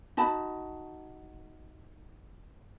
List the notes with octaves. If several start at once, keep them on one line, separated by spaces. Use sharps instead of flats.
D#4 F#4 A5 B5